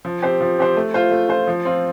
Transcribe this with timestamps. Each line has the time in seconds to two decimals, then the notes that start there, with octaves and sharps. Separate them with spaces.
0.05 F3
0.22 C4 G4 C5
0.41 F3
0.59 C4 G4 C5
0.77 A3
0.94 F4 C5
1.11 A3
1.29 F4 C5
1.47 F3
1.65 C4 F4